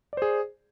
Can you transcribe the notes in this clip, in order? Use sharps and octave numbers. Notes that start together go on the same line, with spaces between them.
G#4 C5 D5